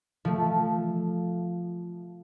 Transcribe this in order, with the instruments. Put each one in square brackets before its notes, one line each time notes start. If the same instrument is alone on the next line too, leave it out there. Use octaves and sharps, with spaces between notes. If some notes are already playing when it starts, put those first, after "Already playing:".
[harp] F3 A3